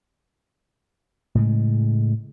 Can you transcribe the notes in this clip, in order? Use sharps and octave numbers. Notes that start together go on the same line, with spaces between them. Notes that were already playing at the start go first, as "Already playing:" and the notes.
A2 C#3 G#3